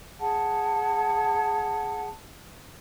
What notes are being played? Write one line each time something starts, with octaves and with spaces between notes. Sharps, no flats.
G#4 F#5 A5